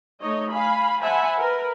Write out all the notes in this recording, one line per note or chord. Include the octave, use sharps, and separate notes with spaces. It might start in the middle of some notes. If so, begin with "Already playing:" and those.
A3 D#4 C#5 D#5
F5 G#5 B5
C5 E5 F#5 G#5 A5 B5
A#4 B4